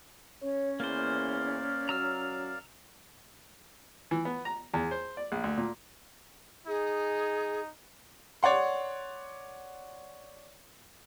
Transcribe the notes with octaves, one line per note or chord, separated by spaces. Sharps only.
C#4 C#5
E2 A#3 A#4 C5 D5 F5
F#3 A#5 E6 F6
E3
B3
A#5
E2
C5
D5
A#1
D2
A#2
D#4 G#4
C#5 D5 F#5 C6